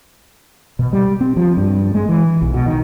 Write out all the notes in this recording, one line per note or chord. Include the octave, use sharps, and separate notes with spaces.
B2
G3
C4
F3
G2
G#3
E3
B1
B2
D#3